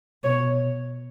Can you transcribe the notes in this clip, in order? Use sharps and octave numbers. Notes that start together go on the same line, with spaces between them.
B2 C#5